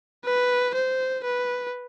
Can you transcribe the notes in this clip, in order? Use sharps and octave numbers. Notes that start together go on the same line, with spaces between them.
B4
C5
B4